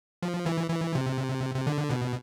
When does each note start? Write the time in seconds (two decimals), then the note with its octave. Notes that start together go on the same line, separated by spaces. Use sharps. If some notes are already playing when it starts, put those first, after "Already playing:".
0.23 F3
0.46 E3
0.70 E3
0.95 C3
1.55 C3
1.67 D3
1.90 B2